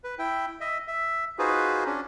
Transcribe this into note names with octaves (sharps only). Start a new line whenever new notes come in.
B4
E4 G5
D#5 E5
E5
D#4 F4 F#4 G#4 B4 C5
C#4 D4